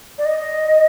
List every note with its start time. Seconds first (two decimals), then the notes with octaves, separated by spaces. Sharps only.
0.18 D5
0.25 D#5